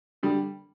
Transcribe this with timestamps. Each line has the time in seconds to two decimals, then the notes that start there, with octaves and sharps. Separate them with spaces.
0.23 D3 G3